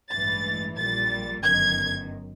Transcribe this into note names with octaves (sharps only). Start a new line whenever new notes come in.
A1 G2 E3 G#3 A6
A#1 A#2 G3 A6
G1 F#2 D#3 G#6